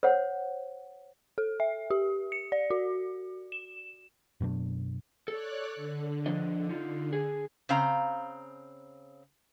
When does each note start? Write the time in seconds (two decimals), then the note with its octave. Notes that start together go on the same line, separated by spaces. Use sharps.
0.03 C5 C#5 F#5
1.38 A4
1.60 E5
1.90 G4
2.32 C#7
2.52 D5
2.70 F#4
3.52 E7
4.40 F#2 B2 F#3 D4
5.28 A4 C#5 D5 F#6
5.76 D3
6.26 F3 D4 D#5
6.69 D#4 F4
7.13 G#4
7.69 C#3 C4 F5 A#5